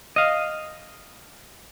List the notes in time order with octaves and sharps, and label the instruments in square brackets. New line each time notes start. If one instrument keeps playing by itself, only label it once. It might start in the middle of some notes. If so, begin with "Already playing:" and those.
[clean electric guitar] D#5 F5